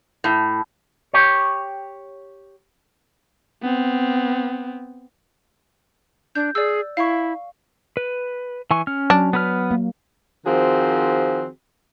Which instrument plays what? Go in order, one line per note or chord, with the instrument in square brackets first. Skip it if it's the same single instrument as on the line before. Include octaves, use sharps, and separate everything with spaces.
[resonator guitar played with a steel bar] A2
[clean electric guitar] G4 C#5
[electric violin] B3 C4
[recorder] D4 [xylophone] G6
[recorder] G#4 [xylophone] D5 E6
[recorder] E4 [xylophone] F5 C#6
[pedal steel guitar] B4
E3 G#5 C#6
C#4 F6
[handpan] F#3 [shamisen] D4
[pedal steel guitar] B3 B4 F6
[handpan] A#3
[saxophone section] D#3 F3 C4 F#4 G#4